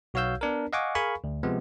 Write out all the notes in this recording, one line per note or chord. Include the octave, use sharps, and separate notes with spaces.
B1 F#4 C#5 F5 E6 G6
B3 D4 A#4
D#5 F5 F#5 G#5 C#6 D6
G#4 A#4 F5 G#5 B5 C#6
D2
C3 F3 G#3 B3